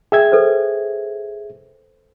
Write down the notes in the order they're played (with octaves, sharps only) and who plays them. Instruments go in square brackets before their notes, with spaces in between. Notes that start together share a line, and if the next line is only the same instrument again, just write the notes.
[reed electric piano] G#4 E5 G#6 [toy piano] G5
[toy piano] A4 B4 C5